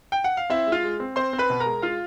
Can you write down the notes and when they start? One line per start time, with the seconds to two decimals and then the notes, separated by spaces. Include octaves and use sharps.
0.12 G5
0.24 F#5
0.37 F5
0.50 C4 E4 E5
0.66 G#3
0.72 F4 F5
0.84 G#3
1.00 C4
1.16 C4 C5 C6
1.33 C4
1.39 B4 B5
1.50 B2
1.60 A#4 A#5
1.66 G#3
1.82 G#3 F4 F5